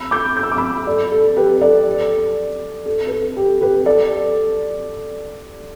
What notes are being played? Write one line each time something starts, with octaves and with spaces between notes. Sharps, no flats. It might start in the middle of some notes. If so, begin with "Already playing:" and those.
Already playing: B5 E6
D6 G6
G6
E6
D6
B5 E6
A4 D5
A4
G4 B4
A4 D5
A4
B4
A4
G4
G4 B4
A4 D5